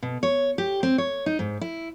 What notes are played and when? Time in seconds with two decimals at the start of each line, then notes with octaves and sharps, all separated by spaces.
0.02 B2
0.23 C#5
0.58 G4
0.83 C4
0.98 C#5
1.26 D#4
1.39 G#2
1.61 E4